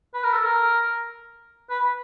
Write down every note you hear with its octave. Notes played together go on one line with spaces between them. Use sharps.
B4
A#4
A4
A#4
B4